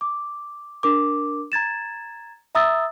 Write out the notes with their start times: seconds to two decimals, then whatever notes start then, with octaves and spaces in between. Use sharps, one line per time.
0.01 D6
0.83 D4 A#4 D6
1.52 A#5 G#6 A6 E7
2.55 E5 A#5 D#6 E6 A6